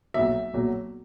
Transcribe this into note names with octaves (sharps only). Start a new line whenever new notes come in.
B1 A#2 F#3 E5
B1 A#2 F#3